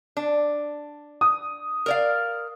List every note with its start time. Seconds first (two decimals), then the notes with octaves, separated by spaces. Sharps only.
0.17 D4
1.21 D#6
1.86 A#4 D5 F5